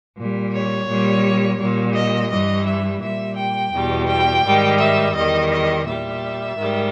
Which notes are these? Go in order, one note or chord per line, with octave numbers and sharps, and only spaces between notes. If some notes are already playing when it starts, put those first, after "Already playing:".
A#2 G3
C#5
A#2 G3
A#2 G3
D#5
G2 E3 G3 D#5
E5
A#2 G3 E5
G5
E2 B2 G3
G5
G#2 D#3 G3
E5
E2 D#3 G3 D#5
D#5
A#2 G3 E5
G#2 D#3 G3